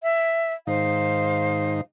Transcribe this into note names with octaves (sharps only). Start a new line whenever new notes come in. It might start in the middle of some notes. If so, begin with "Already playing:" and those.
E5
G#2 D#3 D#4 C5 F5